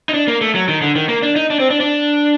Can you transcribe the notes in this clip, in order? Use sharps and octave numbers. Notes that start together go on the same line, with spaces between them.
D#4
D4
A#3
A3
F#3
D#3
D3
D#3
A#3
D4
D#4
D4
C4
D4
D4